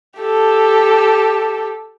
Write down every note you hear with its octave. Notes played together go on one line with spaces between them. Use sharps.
G4 A4